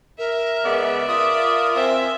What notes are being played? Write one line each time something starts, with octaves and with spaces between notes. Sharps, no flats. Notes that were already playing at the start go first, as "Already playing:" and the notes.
A#4 E5
C#3 G#3 B3 D5
F4 A#4 E5 D#6
C4 E5 G#5